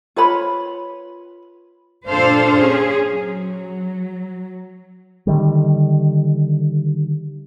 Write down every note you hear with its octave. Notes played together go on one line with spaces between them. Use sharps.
F4 B4 C#5 B5
A#2 D4 A4 C5 F5
C#4 G#4
F#3
D3 D#3 G3